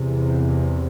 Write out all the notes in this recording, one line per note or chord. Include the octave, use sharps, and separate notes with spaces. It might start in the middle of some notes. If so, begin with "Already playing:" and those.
Already playing: E2 C3